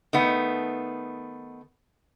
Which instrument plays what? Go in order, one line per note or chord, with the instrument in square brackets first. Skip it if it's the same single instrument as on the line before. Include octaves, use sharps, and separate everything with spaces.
[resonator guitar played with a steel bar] D#3 A3 B3